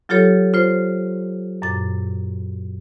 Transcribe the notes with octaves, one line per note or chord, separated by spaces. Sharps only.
F#3 F4 G4 A4 C#5
F4 C5
F#2 A#2 A6